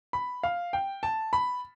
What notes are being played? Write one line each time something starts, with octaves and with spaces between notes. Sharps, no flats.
B5
F5
G5
A5
B5